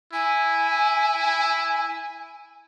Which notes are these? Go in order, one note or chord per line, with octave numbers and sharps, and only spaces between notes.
E4 G#5